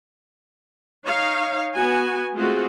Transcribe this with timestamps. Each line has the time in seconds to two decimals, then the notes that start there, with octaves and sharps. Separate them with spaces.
1.05 D#4 C#5 F5
1.74 B3 F#4 G#5
2.35 G#3 A3 C4 F4 F#4 G#4